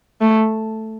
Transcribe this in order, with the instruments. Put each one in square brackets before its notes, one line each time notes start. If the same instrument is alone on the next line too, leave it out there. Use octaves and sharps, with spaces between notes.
[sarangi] A3